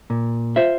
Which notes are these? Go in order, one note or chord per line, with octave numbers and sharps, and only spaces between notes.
A#2
F4 C5 E5